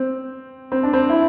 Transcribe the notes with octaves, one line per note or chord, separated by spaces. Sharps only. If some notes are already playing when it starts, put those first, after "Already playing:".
Already playing: C4
C4
D4
C4
E4